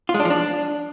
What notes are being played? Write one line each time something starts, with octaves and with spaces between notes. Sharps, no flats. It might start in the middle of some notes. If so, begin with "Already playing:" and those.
F4
G#3
D4
F3
D4